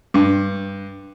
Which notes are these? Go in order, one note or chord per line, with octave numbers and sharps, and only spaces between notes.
G2